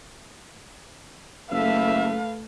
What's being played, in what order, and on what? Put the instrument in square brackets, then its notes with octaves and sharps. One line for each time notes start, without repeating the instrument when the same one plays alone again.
[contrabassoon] F#1 [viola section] A3 A4 B4 [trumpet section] E5 [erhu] F5